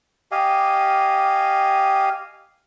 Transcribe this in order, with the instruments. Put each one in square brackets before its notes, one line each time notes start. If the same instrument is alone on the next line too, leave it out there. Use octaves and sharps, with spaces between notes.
[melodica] G4 D#5 F5 G#5